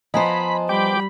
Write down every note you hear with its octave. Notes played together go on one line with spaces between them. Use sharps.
F3 B3 C5 D#5 G#5 A#5 B5
G3 G5 B5 D6